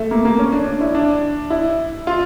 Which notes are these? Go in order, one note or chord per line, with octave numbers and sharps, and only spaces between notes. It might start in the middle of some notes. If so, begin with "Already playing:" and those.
Already playing: A3
A#3
A#3
C#4
D4
D4
E4
D4
E4
F4